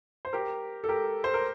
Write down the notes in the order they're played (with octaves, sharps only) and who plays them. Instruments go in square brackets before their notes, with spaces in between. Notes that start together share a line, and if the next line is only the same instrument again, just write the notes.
[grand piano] C5
G4 A#4
A4
G4 A#4
C5
A#4